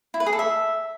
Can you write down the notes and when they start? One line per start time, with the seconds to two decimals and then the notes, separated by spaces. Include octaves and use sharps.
0.14 E4
0.20 B4
0.26 G#4
0.33 A4
0.39 E5